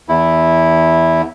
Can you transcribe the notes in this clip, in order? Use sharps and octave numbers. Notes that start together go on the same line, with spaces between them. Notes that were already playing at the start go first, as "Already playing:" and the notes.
E2 E4